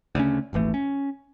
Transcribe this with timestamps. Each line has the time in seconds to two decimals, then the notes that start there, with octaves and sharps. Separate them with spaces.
0.15 D2 C#3 C#4
0.53 D#1 G#1 E3 A3
0.74 C#4